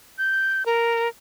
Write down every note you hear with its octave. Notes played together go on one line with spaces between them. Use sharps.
G6
A#4